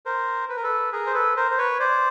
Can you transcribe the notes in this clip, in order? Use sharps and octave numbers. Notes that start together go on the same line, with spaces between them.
A#4 C5
B4
A#4
A4 B4
G#4 A#4
C5
A4 B4
A#4 C5
C5
B4 C#5
C5 D5